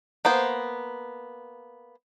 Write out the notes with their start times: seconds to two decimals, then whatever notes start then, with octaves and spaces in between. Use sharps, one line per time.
0.25 A#3 B3 C5